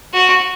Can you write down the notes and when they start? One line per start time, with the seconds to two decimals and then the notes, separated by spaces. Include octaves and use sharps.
0.14 F#4